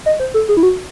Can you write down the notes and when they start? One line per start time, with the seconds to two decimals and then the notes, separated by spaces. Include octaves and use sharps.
0.06 D#5
0.20 C5
0.34 A4
0.49 G#4
0.57 E4
0.63 F#4